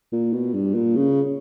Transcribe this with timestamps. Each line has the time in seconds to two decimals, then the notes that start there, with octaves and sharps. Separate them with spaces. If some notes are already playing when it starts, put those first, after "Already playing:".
0.12 A#2
0.33 B2
0.54 G2
0.75 A#2
0.96 C#3